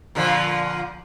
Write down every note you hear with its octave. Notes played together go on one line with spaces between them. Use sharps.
A#2 D3 F3